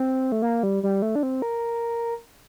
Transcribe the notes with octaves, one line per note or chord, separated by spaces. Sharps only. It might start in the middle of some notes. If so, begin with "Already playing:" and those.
Already playing: C4
A3
A#3
G3
G3
A3
D4
C4
A#4